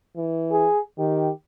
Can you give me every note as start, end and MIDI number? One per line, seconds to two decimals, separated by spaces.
0.16 0.67 52
0.52 0.80 68
0.98 1.30 51
0.98 1.31 67